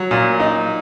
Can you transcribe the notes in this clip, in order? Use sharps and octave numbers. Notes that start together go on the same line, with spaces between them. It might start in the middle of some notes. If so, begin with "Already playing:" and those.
Already playing: F#3
A#2
D#4